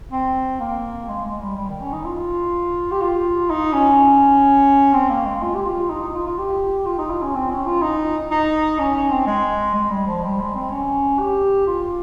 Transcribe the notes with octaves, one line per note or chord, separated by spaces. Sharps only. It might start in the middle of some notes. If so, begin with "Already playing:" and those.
C4
A#3
G#3
G#3
G3
G3
D#3
C#4
D#4
F4
G4
F4
D#4
C#4
C4
A#3
G#3
F4
G4
F4
D#4
D#4
F4
F4
G4
F4
D#4
F4
C#4
C4
C#4
F4
D#4
D#4
C#4
C#4
C4
G#3
G#3
G3
F3
G3
G#3
C4
C#4
G4
F4